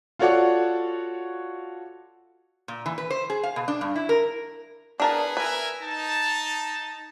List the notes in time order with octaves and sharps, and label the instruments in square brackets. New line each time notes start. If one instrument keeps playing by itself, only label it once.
[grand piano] F4 F#4 A4 C#5 D5 F#5
[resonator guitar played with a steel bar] A#2
E3
B4
C5
G#4
F5
B2
D4
G2
E4
A#4
[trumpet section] B3 G#4 B4 [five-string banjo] D4 A#4 A5
[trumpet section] A#4 E5 G#5 [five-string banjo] B4
[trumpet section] D#4 A5